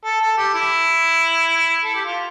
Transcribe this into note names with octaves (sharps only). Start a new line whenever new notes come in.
A4
A4
G4
E4
A4
G4
F4